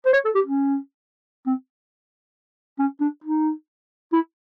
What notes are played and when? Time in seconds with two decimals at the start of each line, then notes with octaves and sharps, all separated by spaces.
0.06 C5
0.13 C#5
0.25 A4
0.35 G4
0.46 C#4
1.46 C4
2.79 C#4
3.01 D4
3.24 D#4
4.12 E4